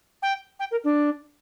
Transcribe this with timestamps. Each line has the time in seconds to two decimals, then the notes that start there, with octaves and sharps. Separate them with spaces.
0.22 G5
0.59 G5
0.71 A#4
0.84 D4